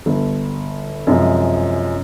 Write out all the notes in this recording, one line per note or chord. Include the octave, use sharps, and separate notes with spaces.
G1
F#2 C3 F3 G#3